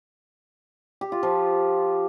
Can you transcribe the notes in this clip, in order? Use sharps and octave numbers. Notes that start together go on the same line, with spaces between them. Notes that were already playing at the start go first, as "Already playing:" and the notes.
G4
F4
F3